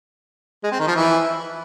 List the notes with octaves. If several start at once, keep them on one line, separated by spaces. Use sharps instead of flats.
G#3
C4
D#3
F3
E3